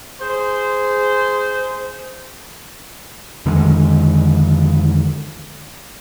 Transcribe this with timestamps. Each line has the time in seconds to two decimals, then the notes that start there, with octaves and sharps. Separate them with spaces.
0.21 G#4 C5
3.46 F2 D3 D#3 G#3